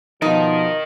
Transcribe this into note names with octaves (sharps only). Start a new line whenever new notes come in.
B2 D#3 F3 D#4 A#4 D#5